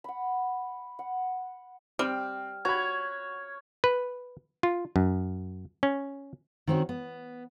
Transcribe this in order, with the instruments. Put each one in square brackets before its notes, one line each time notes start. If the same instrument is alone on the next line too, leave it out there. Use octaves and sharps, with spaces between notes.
[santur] F#5 B5
F#5
[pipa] G3 [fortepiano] C4 [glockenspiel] F6
[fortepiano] F#4 B5 [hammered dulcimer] C#5 [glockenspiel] G#6
[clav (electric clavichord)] B4
F4
F#2
C#4
[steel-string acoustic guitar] D#3 C4 C#4 F#4
B3